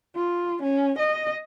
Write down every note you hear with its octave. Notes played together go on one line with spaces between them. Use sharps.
F4
C#4
D#5